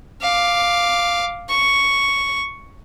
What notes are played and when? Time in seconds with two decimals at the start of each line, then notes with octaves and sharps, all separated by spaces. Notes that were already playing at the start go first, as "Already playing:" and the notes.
0.21 F5 D6
1.49 C#6